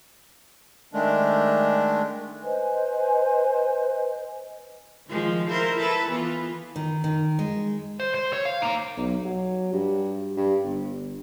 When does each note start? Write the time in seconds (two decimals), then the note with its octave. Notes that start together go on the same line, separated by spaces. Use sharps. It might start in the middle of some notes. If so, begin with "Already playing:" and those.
0.93 D#3 G#3 A3 D4
2.42 B4 C5 D#5 G#5
5.08 D#3 F3 G#3
5.48 E4 A#4 C5
5.79 E4 A4 B4
6.09 E3 B3 F4
6.76 D#3
7.04 D#3
7.39 G#3
8.00 C5
8.14 C5
8.33 C#5
8.45 F5
8.62 A#3 D#4
8.97 B1
9.25 F#3
9.73 G2
10.36 G2
10.64 G1